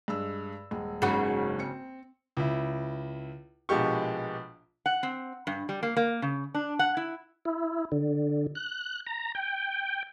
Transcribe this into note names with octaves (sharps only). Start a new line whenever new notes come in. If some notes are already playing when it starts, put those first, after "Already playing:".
G2 G#3 E6
D#1 G#3
F#1 G#2 C#3 F#4
C4 C#7
C#2 E4
A#1 B2 G#3 G4 C#6
F#5
C4
G2
G3
A#3
A#3
C#3
D4
F#5
E4
E4
D3
F#6
A#5
G5